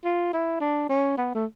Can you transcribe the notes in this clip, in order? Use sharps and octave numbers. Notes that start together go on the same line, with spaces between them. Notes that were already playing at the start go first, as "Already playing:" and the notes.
F4
E4
D4
C#4
B3
A3